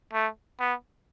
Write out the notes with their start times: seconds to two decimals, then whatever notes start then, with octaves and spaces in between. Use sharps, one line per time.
0.13 A3
0.60 B3